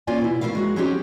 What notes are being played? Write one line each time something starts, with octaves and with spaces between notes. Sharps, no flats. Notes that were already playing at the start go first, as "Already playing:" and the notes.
A#3 C#4 F4 C#5 D5 G#5
B2 E4
A3 C#4 D4 E4 A#4 F5
G#3 F#4 A#4
F#3 C4 C#4 D#4 F#4 G4